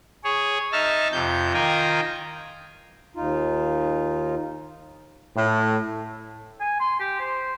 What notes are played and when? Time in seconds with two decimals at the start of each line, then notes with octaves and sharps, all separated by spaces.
0.24 G#4 C#5
0.72 D#4 E5 A5 F6
1.12 F2 C3 G6
1.54 D#3 F4 G5 G#5 A#5
3.16 D#2 D#4 F4
5.36 A2
6.60 G#5
6.80 C6
7.00 G4
7.20 C5